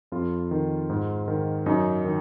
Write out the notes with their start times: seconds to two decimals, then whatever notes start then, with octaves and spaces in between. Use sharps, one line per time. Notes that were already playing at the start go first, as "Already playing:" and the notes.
0.12 F2 F4
0.51 D#3
0.90 G#2
1.28 D#3
1.66 F#2 D#4
2.05 D#3